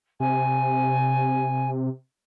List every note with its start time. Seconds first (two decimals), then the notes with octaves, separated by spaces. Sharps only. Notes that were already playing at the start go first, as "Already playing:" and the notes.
0.20 C3 G#5